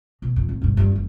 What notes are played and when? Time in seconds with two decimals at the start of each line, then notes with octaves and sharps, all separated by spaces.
0.22 B2
0.36 F2
0.49 G#1
0.62 E1 G2
0.77 G2 G3
0.92 F#1 F2